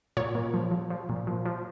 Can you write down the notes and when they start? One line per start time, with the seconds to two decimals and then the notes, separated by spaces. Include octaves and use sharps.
0.17 A#2 C#5
0.35 A#2
0.54 F3
0.71 F3
0.90 F3
1.09 A#2
1.27 F3
1.46 F3